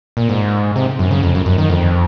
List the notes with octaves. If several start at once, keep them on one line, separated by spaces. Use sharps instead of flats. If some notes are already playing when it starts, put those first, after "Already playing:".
A#2
G#2
C3
F#2
C#3
F2
F#2
F#2
D#3
F2